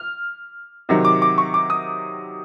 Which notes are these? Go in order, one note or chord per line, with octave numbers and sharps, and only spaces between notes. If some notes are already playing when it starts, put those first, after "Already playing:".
Already playing: F6
C3 D#3 F#3
D6
D6
C#6
D6
D#6